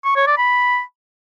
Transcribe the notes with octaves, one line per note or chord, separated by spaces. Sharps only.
C#6
C#5
D5
B5